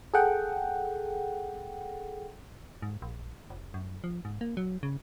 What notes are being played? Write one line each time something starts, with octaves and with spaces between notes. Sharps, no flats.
G#4 A4 F#5 G5
G#2
A#1
F1
F#2
F3
G#2
A#3
F#3
C#3